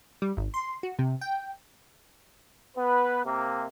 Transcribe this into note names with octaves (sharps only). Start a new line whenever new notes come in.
G3
G#1
C6
F#4
C3
G5
B3 B4
C3 A#3